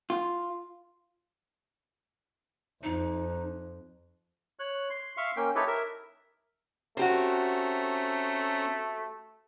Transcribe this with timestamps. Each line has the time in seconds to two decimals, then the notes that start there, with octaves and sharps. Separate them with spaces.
0.10 F4
2.84 F2 D#4
4.59 C#5 F#6
4.90 C6
5.17 E5 F5 C6 C#6
5.36 A#3 C#4 G5
5.55 D#4 E4 G4 A4 B4 C#5
5.67 A#4 E5
6.97 A3 C4 C#4 F#4 G4 C5 A#5